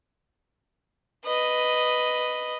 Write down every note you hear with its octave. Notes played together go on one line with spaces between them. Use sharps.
B4 D#5